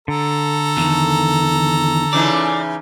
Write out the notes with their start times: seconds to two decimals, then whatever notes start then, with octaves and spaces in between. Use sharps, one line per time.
0.08 D3 A4 A#5
0.77 E2 D#3
2.13 C#3 E3 D#4 D5